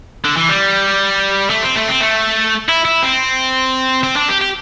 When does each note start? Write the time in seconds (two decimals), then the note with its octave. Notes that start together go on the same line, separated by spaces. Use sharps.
0.25 D3
0.37 E3
0.49 G3
1.50 A3
1.63 C4
1.76 A3
1.88 C4
2.01 A3
2.69 E4
2.85 E4
3.02 C4
4.03 C4
4.16 D4
4.29 G4
4.42 G4